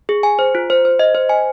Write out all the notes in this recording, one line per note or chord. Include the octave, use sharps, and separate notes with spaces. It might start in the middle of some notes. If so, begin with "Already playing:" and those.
G#4
G#5
C5
F4
C5
C5
D#5
C5
G#5